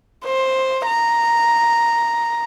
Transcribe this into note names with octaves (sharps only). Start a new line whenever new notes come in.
C5
A#5